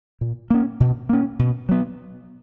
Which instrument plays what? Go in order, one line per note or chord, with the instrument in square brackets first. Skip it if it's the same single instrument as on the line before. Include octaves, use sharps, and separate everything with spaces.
[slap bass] A#2
A#3 C#4
B2
A#3 C#4
B2
F#3 B3